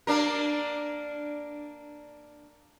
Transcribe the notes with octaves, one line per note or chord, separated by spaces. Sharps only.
A#3 D4 A#4